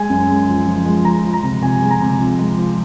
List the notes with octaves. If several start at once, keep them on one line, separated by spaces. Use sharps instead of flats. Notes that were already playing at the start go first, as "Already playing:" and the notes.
Already playing: G#3 G#5
F#2
G#3
F3
F3
G#3
F3 A#5
F3
A#5
C3
C3 G#5
G#3
A#5
C3
F3
G#3
F3